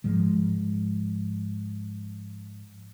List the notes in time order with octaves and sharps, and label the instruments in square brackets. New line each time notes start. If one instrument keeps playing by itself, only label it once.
[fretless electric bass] G#2 F3 G#3